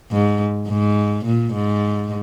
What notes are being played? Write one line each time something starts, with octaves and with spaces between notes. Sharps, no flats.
G#2
G#2
A#2
G#2